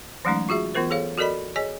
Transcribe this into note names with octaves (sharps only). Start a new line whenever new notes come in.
E3 F#3 G#3 A3 C#4 D#4
F4 F#4 G#4 E5
E3 B3 F4 A#4 C5
G#4 A4 C#5 F5
F#4 A4 A#4 D5 D#5 B5
G#4 C#5 D#5 G#5